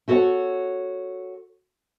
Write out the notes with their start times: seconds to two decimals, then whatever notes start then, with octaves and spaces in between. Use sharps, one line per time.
0.08 E4 F#4 A4 B4 C#5 F#5